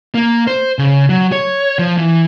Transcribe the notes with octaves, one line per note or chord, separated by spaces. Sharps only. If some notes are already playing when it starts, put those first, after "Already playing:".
A#3
C5
C#3
F#3
C#5
F3
E3